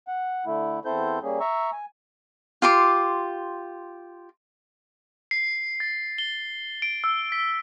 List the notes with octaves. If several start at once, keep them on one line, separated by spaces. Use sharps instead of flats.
F#5
D3 A3 E4
E2 C4 E4 A4 C5 G6
G3 A#3 C#4 G#4
E5 A#5 C#6 E6
G#5
F4 G4 C6 D6
C7
A6
G7
D7
E6
B6